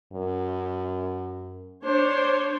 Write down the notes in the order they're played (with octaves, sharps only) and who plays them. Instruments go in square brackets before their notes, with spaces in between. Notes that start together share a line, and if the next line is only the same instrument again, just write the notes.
[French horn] F#2
[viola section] D4 C5 C#5